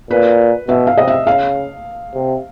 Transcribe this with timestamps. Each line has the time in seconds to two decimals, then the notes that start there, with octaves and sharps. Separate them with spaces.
0.10 A#2 B4
0.68 B2 E5
0.87 F5
0.97 C3 D#5
1.08 E5
1.26 C#3 F5
2.14 C3